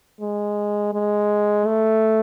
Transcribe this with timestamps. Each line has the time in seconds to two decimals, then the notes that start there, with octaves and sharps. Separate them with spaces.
0.21 G#3
0.93 G#3
1.67 A3